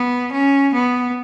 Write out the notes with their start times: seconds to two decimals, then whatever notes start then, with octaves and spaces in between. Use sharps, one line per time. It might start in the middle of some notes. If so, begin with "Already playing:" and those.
Already playing: B3
0.32 C#4
0.74 B3